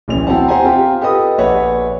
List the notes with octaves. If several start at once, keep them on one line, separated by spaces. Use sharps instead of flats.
D1 A#1 E3 C#4 F7
C4 E4 F#4 C5 F#5 A5
G4 C5 F#5 G#5 A#5
C4 F4 G4
G4 A4 B4 D#5 D#6
A#1 B4 C#5 E5 F#5